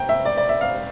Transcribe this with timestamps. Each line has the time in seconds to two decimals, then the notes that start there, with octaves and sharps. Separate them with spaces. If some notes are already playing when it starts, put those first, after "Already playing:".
Already playing: G5 A#5
0.09 E5
0.25 D5
0.37 D5
0.49 E5
0.61 F5